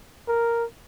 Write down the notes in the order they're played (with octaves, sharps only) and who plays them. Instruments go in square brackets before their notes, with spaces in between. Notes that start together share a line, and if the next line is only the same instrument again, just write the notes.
[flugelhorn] A#4